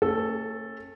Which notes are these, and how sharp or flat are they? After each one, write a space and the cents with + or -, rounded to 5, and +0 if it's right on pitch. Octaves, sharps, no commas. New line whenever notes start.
A3 +40 C#4 -30 A4 +0